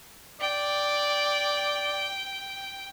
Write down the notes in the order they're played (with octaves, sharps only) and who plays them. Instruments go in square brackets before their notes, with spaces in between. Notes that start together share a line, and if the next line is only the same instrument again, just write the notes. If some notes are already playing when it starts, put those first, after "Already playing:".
[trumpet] D5 [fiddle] G5